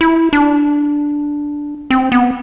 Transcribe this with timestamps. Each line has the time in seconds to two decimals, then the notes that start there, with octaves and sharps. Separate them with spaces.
0.01 E4
0.33 D4
1.90 C4
2.12 B3